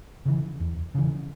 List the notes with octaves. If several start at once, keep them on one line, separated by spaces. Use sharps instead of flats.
C#3 E3
E2
C#3 E3